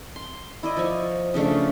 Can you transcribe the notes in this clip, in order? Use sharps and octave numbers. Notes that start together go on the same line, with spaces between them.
C6
E4 D5 D#5
F3 C#6
C#3 F3 A3 D4